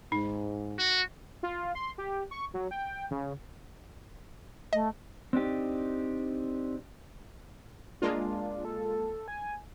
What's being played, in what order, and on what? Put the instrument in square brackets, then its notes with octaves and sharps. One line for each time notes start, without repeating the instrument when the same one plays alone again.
[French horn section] G#2 [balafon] D#4
[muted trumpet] F#4
[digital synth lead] F4
C6
G4
C#6
F#3
G5
C#3
[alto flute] A3 [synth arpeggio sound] D#5
[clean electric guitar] C4 D4 D#4 G4
[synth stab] G#3 A#3 F4 [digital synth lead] D4
[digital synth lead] A4
G#5